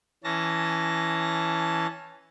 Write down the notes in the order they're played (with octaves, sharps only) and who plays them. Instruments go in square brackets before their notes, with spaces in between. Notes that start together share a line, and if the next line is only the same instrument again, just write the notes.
[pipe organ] E3 C#4 A5 A#6